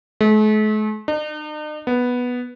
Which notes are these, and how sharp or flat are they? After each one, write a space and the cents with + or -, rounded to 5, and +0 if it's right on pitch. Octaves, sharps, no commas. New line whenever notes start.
A3 -45
D#4 -45
B3 -5